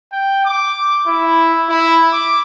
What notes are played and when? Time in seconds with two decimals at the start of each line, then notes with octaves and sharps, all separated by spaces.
0.12 G5
0.45 D6
1.07 E4
1.69 E4
2.13 D6